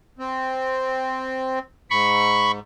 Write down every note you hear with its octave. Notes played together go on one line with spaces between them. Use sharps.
C4
G#2 B5 C#6